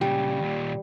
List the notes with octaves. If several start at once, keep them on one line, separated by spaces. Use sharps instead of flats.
A#2 C#3 G3
D#2 A#2